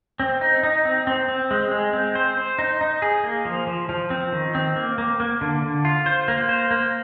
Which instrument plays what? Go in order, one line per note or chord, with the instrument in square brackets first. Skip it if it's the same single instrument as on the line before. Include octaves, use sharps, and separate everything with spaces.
[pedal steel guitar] C4
D#4
D#4
C4
C4
C4
G#3
G#3
C4
C5
C5
D#4
D#4
G#4
A#3
F3
F3
F3
C4
D#3
C4
A#3
A#3
A#3
D3
D3
F4
C5
A#3
C5
A#3